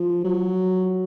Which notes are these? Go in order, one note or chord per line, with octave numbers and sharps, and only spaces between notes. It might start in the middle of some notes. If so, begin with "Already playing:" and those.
Already playing: F3
F#3